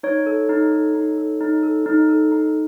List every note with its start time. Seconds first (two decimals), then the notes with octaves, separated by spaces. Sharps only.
0.03 D#4 C#5
0.26 A4
0.49 D#4
0.72 A4
0.95 D#4
1.18 A4
1.40 D#4
1.63 A4
1.86 D#4
2.09 A4
2.32 D#4